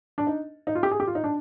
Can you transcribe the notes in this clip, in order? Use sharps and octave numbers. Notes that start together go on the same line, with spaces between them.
D4
D#4
D#4
F4
G4
G#4
G4
F4
D#4
D4